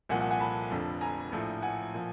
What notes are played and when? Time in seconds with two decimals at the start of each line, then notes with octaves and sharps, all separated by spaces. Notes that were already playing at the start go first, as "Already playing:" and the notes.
0.09 C2 A#2 F3 F#5 G#5
0.20 F#5 G#5
0.30 F#5 G#5
0.40 A5 B5
0.71 F1 F2 D3 F3
1.01 G#5 A#5
1.32 A#1 A2 F3
1.62 F#5 G#5
1.94 A#2 F3